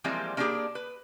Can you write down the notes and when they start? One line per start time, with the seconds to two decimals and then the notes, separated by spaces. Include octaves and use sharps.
0.04 E3 F3 G3 G#3 A#3 C4
0.37 A#3 C#4 D4 E4 G4 G#4
0.75 B4